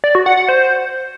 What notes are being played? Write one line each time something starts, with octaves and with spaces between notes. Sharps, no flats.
D5
F#4
F#5
F#5
C5